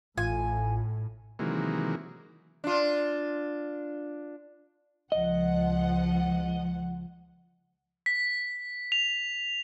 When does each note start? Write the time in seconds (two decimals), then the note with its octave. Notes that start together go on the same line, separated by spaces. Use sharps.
0.18 A1 A2 F4 G#5
1.39 C3 D#3 E3 F#3 G#3 A#3
2.64 D4 F4
5.12 C#2 F3 D#5 F#5
8.06 B6
8.92 F7